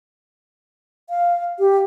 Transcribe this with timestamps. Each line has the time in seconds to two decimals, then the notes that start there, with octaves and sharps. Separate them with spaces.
1.10 F5
1.59 G4